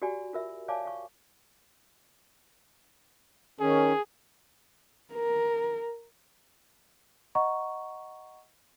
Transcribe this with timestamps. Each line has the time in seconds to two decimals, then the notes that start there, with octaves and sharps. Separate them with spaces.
0.02 F#4 G4 D5 G#5
0.33 F4 A#4 E5
0.68 C#5 D5 F5 G#5 A5 D6
0.85 F5 C#6
3.60 D#3 C#4 G#4
5.13 A#4
7.35 D#5 F#5 A#5 C#6